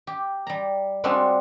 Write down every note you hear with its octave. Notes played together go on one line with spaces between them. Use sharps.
G4
G3 A#5
G3 G#3 C4 D4 F4 F#4